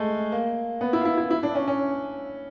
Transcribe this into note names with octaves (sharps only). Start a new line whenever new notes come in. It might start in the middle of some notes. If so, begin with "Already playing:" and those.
Already playing: G#3 A3
A#3
B3
E4
F4
E4
E4
E4
D4
C#4
C#4